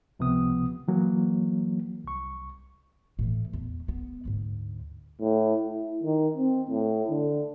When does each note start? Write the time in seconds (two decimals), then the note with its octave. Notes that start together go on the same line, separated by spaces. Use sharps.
0.19 C#2 C3 F3 B3 D#6
0.88 E3 F#3 A#3
2.04 C2 C#6
3.19 A2 E3
3.53 E2
3.88 B3
4.25 D2 G#2
5.21 A2
5.69 E4
6.03 D#3
6.37 C4
6.70 A2
7.11 D3